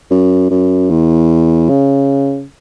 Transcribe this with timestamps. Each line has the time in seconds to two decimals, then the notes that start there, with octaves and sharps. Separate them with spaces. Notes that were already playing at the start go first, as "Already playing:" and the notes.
0.11 F#2
0.50 F#2
0.90 E2
1.69 C#3